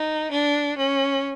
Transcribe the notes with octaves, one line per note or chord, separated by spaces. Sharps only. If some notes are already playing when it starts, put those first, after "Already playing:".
Already playing: D#4
D4
C#4